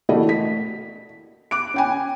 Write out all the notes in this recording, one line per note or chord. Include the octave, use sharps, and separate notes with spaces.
E3 A3 A#3 F#4 D5 D#5
B6
D6 F#6 D7
C#4 G5 G#5